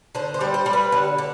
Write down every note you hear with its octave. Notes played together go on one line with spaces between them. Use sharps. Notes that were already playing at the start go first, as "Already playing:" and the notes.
D3 C5
C5
G3
C5
G3
B4
D3
D3